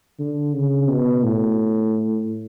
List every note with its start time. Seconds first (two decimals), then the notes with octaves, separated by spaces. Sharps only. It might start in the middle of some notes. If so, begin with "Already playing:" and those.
0.19 D3
0.54 C#3
0.88 B2
1.23 A2